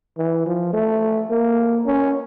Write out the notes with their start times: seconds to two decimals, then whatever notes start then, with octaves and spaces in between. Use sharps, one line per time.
0.18 E3
0.46 F3
0.73 A3
1.30 A#3
1.86 C#4